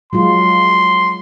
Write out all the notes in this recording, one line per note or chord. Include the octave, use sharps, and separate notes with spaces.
F#3 G#3 F4 C6